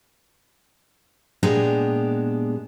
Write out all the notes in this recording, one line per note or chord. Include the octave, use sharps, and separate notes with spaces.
A#2 G#3 B3 D4 G4 A#5